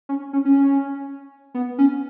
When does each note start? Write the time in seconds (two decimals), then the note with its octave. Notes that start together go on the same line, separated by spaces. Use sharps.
0.09 C#4
0.33 C#4
0.45 C#4
1.54 B3
1.78 C#4